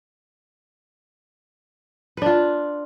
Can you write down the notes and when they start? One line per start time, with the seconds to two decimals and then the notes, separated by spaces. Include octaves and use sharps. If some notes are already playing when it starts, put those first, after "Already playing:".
2.17 B4
2.22 D4
2.26 F4